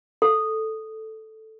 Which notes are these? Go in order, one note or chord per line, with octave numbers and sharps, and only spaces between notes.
A4